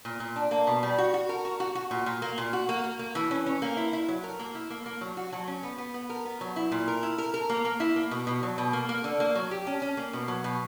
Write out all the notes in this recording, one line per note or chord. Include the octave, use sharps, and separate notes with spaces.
A#2
A#2
D4
A#3
B2
G3
F#4
F#4
A#4
F#4
F#4
F#4
A#2
A#2
A#3
A#2
F#4
A#3
A#3
A#3
E3
C#4
C#4
A#3
E4
E4
F#3
A#4
A#3
E4
A#3
A#3
F#3
F#4
F#3
C#4
B3
B3
B3
A#4
B3
F#3
E4
A#2
A#4
E4
A#4
A#4
A#3
A#3
E4
A#3
B2
B2
F#3
B2
A#3
A#3
D3
A#3
F#3
G4
C#4
C#4
A#3
B2
F#3
B2